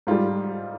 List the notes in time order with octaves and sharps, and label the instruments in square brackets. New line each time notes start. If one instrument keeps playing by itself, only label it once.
[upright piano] G#2 G3 F4